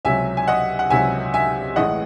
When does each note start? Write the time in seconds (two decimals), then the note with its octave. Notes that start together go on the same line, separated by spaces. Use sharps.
0.05 C#2 C3 F#3 E5 G#5
0.37 G#5
0.48 D#5 F#5
0.79 F#5
0.90 C#2 C3 F#3 E5 G#5
1.34 E5 G#5
1.76 A1 A2 E3 G#3 D#5 F#5